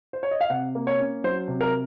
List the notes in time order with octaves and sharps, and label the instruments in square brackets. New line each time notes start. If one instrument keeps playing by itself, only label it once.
[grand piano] C5
C#5
D#5
F5
C3 F#5
A#3
C#5
C#4
F#3 C5
C3
A#4